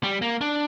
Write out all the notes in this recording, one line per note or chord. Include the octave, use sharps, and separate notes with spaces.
G3
A#3
D4